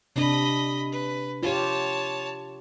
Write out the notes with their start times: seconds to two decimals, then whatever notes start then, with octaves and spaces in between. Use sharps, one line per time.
0.16 C3 D4 D#5 B5
0.92 B4
1.43 F4 G4 C#5 A5